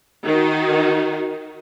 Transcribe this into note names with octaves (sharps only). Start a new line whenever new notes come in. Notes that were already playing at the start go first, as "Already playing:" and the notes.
D#3 D#4 F#4